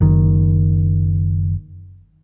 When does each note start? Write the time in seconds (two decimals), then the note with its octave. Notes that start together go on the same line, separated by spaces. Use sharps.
0.01 F#1 D#3